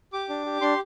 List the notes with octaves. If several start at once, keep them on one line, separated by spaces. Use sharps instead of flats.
G4 D6
D4
G4
D4 C6